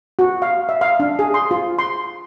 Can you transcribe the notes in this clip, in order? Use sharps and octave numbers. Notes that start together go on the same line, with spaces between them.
F#4
F5
E5
F5
D4
G#4
C6
F4
C6